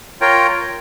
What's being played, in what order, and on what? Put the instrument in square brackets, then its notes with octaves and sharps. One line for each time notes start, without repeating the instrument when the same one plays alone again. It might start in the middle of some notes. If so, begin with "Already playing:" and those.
[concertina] F4 A#4 C#5 G5